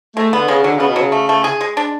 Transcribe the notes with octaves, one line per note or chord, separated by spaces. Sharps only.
G#3 A3
D3 B3
C#3 G#3
D3 F#3
C#3
B3
B2
C#3 F#3
A3
A3
G#4
G#3
D4